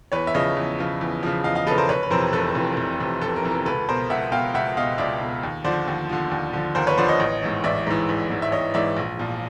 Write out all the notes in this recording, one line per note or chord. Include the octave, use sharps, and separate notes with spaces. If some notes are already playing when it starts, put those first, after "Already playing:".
E2 B4 C#5
E5
C#3 F3 C#5 D#5
E2
C#3 F3
E2
C#3 F3
E2 D#5 F5
D#5 F5
C#3 F3 A4 B4
A#4 C5
F1 B4 C#5
B4
F2 C3 E3 A#4 C5
F1 A4 B4
F2 C3 E3
F1
F2 C3 E3
F1 A4
A#4
F2 C3 E3
A#4
C#2 A4 B4
B2 A#4 C5
C#2 E5 F#5
B2 F5 G5
C#2 E5 F#5
B2 D#5 F5
C#2 D5 E5
B2
D#2
D3 F3 C5 D5
D#2
D3 F3
D#2
D3 F3
D#2 A#4 C5
B4 C#5
D3 F3 C5 D5
C#5 D#5
A1
G#2 E3
A1 D5 E5
G#2 E3
A1
G#2 E3
E5
A1 C#5 D#5
G#2 E3 D5 E5
A#1
A#2 F3